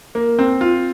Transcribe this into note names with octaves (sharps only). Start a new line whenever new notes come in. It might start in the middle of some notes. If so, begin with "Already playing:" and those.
A#3
C4
F4